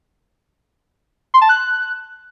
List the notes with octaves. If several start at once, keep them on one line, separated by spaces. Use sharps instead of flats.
C6
A5
F#6